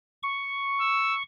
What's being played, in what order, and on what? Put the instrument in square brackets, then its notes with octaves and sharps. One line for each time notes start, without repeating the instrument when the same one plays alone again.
[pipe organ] C#6
[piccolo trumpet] E6